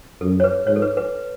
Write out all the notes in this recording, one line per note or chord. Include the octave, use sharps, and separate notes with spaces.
F#2 A4
C#5
B4
G#2 C#5
A4
B4
B4